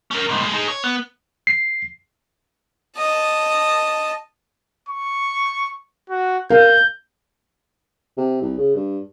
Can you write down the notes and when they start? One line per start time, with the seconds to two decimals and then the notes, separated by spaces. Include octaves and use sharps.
0.11 C#4 A#4
0.29 C2 G#2
0.41 A2 G#3
0.54 D#4 G#4
0.68 C#5
0.84 B3
1.47 C7
2.97 D#5 A5
4.89 C#6
6.10 F#4
6.50 A#4 F5 G6
8.18 C3
8.42 C2
8.58 C#3
8.75 G2